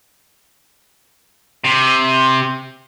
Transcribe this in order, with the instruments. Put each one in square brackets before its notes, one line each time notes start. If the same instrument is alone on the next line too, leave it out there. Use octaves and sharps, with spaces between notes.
[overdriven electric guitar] C3